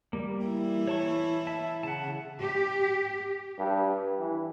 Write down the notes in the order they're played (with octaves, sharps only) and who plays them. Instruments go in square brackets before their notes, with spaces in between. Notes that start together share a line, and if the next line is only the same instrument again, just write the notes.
[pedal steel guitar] G3 A#3
[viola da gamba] E3 E4
[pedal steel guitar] C#5 A5 C#6
E5 A5
[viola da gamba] C#3 [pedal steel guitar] F#5 A5
[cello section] G4
[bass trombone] G2
E3